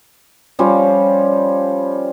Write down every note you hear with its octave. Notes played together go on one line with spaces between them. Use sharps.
F3 G3 C#4 F4